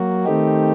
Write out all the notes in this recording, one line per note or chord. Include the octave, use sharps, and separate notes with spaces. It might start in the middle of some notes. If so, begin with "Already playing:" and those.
Already playing: F#3 A#3 F#4
D#3 A3 C4 D#4 G4